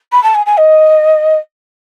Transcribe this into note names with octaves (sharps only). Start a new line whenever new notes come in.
B5
A5
G#5
G#5
D#5